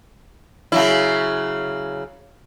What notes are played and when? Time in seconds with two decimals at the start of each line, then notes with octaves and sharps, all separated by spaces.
0.72 C#3 F#3 E4